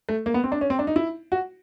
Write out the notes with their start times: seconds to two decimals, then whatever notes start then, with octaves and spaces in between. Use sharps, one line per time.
0.09 A3
0.26 A#3
0.34 B3
0.44 C4
0.52 D4
0.61 C#4
0.70 C4
0.79 D4
0.87 D#4
0.96 E4
1.32 F#4